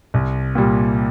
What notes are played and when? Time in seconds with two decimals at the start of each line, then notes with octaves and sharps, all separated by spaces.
0.14 C2
0.55 A#2 G3